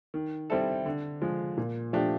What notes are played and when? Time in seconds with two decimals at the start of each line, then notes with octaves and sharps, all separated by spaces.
0.14 D#3
0.50 G3 C4 E4 A4
0.85 D3
1.22 F3 G#3
1.57 A#2
1.93 F3 A3 D4 G4